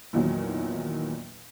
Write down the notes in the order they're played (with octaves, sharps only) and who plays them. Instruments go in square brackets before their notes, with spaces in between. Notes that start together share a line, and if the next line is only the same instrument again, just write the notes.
[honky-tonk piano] A#1 E2 A#2 D#3 F#3